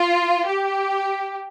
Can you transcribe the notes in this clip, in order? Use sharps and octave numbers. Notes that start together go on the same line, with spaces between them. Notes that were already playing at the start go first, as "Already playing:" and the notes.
Already playing: F4
G4